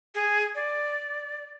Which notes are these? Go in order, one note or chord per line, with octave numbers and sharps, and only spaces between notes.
G#4
D5